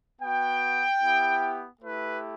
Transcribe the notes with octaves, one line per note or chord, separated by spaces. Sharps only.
B3 F#4 G5
B3 E4 G4
A3 E4 G4 B4